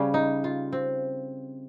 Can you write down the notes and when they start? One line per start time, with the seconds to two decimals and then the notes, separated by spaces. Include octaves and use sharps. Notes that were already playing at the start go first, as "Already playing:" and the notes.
Already playing: C#3 G3 C#4
0.14 D#4
0.44 F4
0.73 C4